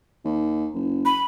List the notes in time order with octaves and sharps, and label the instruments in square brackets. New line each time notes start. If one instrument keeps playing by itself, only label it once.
[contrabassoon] D#2
F#1
[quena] B5